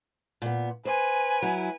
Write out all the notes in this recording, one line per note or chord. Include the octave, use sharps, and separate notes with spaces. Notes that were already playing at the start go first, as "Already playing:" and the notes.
A#2 B3
B4 C5 G#5
F#3 E4